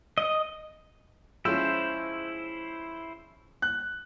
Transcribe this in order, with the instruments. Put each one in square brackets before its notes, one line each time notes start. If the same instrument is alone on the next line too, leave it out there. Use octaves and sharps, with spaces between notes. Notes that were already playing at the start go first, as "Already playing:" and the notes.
[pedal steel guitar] D#5
[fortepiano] F3 G#3 C#4 [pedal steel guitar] E4 C5 [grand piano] E6
[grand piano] F#6